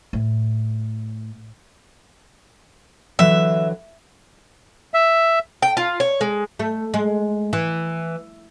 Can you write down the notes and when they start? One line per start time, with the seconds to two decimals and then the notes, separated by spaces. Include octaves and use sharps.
0.13 A2
3.19 D3 E3 F#3 E5
4.94 E5
5.62 G5
5.77 F4
6.00 C#5
6.21 G#3
6.59 A3
6.94 G#3
7.53 E3